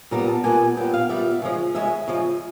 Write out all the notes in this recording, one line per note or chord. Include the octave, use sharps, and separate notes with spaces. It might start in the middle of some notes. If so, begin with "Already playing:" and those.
A#2 G3 B3 A#5
A5
A#2 G3 B3 G#5
A#2 G3 B3 G5
F5
A#2 G3 B3 E5
C#3 F3 G#3
C#3 F3 G#3 E5
C#3 F3 G#3